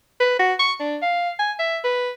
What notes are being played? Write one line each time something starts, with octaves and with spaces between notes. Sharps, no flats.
B4
F#4
C#6
D4
F5
G#5
E5
B4